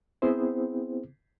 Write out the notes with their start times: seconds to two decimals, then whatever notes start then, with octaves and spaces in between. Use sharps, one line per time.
0.22 B3 C4 E4 G#4 C5